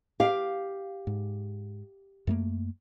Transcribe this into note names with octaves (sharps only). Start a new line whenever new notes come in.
G4 F5
G#2
F#2 A3 A#3